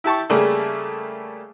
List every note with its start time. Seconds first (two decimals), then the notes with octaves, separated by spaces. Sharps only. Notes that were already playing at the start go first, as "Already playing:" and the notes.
0.04 E4 G4 A5 C#6
0.30 C#3 G3 A3 A#3 G#4